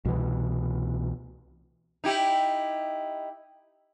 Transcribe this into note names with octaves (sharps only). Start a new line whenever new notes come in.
C2 B2 D3 E3
D#4 E4 G4